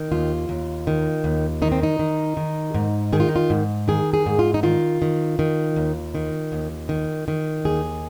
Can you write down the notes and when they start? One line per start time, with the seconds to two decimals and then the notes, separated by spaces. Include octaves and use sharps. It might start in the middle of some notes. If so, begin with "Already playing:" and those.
Already playing: D#3
0.12 D#2 F4
0.49 D#2
0.87 D#3
1.24 D#2
1.62 D#3 D#4
1.72 C4
1.83 D#4
1.99 D#3
2.37 D#3
2.74 G#2
3.13 D#3 G#4
3.20 F4
3.29 D#4
3.36 F4
3.50 G#2
3.88 D#3 G#4
4.14 G#4
4.26 G#2
4.39 F4
4.54 D#4
4.63 D#3 F4
5.02 D#3
5.39 D#3
5.76 D#2
6.15 D#3
6.52 D#2
6.89 D#3
7.28 D#3
7.65 D#2 G#4